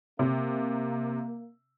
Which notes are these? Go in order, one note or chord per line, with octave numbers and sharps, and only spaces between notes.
C3 A#3